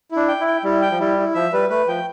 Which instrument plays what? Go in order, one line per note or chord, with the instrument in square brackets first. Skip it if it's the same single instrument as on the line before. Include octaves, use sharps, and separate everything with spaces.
[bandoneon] D4 [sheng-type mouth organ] E4
[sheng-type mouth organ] G5
[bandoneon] E4
[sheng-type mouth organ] G5
[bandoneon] G3 [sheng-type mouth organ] E4
[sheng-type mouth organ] G5
[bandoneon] F3
[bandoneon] G3 [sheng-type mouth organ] E4
[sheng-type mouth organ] E4
[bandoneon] F3 [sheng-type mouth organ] E5
[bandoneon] G3 [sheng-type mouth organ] B4
[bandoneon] A3 [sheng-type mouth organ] B4
[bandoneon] F3 [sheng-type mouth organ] G5